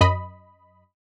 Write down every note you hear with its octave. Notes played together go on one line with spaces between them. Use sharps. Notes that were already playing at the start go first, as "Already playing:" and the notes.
F#2 D#5 B5